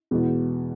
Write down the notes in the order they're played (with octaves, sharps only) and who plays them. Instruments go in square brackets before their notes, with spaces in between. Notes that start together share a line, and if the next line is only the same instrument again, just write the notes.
[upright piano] E2 B2 G#3 B3